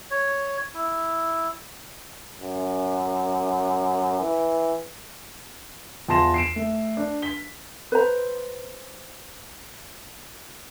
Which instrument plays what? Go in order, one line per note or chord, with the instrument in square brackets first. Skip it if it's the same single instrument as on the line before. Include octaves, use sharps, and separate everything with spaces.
[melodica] C#5
E4
[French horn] F#2
E3
[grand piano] E2 F4 A5 C6 A#6 E7
C7 D7 E7
A3
D4
B6 G7
[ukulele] B4 C5 A#5